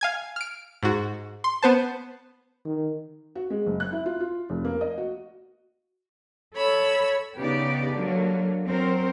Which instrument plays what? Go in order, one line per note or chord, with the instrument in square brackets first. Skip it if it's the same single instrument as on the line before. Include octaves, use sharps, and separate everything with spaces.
[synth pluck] F5 G#5 G#6
F6 D7
G#2 F#4
C6
B3 C5 A5
[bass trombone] D#3
[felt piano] F#4
G#3
F#1
F#6
E4
F4
F4
F1
A#3
D#5
F#4
[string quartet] A4 C#5 B5 E6
[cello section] C#3 B3 D#4 G4 B4 D5
D3 F#3 A#3
F#3 C4 A#4 C5